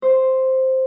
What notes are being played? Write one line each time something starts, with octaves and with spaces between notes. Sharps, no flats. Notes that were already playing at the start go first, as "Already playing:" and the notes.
C5